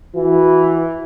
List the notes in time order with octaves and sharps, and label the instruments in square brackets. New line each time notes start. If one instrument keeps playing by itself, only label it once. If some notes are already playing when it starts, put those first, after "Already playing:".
[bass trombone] E3 [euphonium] F#4